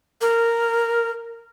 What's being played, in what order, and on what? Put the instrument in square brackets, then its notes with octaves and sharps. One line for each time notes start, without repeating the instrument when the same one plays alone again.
[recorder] A#4